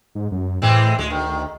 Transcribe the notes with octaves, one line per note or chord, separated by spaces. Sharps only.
G#2
F#2
A2 E3 G#3 C4
D2 G#3
D#3